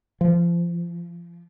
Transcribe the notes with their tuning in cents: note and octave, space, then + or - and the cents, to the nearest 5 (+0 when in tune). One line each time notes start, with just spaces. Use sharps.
F3 -25